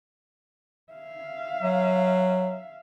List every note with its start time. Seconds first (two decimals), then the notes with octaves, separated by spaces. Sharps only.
0.93 E5 F5
1.62 F#3